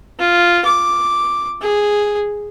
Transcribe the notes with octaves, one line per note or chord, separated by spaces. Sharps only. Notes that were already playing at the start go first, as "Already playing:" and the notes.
F4
D6
G#4